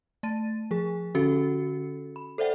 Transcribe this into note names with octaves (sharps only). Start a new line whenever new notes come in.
A3 A5 A6 D#7
F3 G#4
D3 C#4 F#4 A4 C#7
B5
A4 C5 D5 E5 F#5 G5